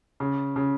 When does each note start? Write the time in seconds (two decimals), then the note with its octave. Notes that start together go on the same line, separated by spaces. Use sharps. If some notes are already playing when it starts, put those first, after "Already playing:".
0.20 C#3
0.56 C#3